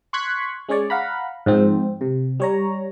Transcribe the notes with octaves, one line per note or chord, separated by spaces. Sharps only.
C6 C#6 F#6 G#6 B6
G#3 C#4 G#4 C#5 D5
F5 F#5 A#5 B5
G#2 F3 C4
C3
G3 C#5 A#5